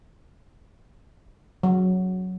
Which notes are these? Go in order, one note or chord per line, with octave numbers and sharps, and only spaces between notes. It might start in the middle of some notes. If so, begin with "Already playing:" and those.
F#3